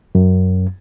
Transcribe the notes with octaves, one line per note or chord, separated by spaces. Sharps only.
F#2